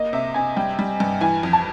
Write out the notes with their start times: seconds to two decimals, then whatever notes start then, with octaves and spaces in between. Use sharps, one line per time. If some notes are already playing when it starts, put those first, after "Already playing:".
Already playing: A#3 D#5
0.13 C3 E5
0.34 C3 G#5
0.56 G3 G5
0.79 G3
1.00 G2
1.21 E3 G#5
1.43 F2
1.53 A5